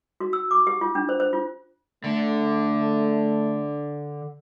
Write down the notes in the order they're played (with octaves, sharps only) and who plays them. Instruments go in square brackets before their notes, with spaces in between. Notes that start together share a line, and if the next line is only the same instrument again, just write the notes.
[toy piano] F#4
E6
D6
G4
F4
D4
C5
C5
F4
[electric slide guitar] D3 [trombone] A3